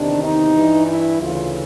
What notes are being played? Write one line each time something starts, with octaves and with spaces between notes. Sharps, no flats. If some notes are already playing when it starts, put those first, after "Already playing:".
Already playing: E2 C3 D#3 D4
D#4
G2 E3
E4
D2 C#3 E3 F4